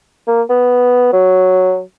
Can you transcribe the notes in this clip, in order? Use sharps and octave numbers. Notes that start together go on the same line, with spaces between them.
A#3
B3
F#3